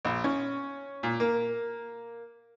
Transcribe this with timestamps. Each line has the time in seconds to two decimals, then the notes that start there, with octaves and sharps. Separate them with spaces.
0.05 A#1
0.24 C#4
1.03 A#2
1.20 A#3